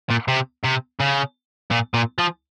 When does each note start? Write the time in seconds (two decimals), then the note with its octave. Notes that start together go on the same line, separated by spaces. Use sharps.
0.11 A#2
0.28 C3
0.64 C3
1.00 C#3
1.71 A#2
1.94 A#2
2.18 F3